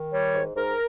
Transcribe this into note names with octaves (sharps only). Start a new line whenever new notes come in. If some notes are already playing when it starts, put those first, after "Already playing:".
Already playing: D#3
G3 C#5
G#2
G#2 A#4